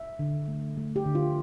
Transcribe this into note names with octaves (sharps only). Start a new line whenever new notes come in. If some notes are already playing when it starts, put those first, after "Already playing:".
Already playing: E5
D3
A3
A3
G4
D3
F4